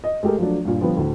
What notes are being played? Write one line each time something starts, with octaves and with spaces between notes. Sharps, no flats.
D#5
G#3 A3 G4 A4 A#4
F3 F#3 A3 D4
G2 A#2
D3 F3 G3 B3
D2 A2